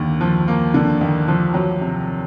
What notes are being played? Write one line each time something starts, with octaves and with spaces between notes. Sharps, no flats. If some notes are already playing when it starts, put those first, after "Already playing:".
Already playing: D#2 D3 A#3
F3
A#3
D3
D#2
F3
F#3
C3